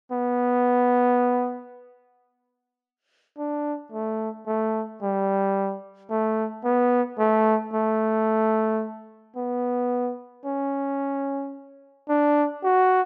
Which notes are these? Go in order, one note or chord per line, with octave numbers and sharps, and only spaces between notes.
B3
D4
A3
A3
G3
A3
B3
A3
A3
B3
C#4
D4
F#4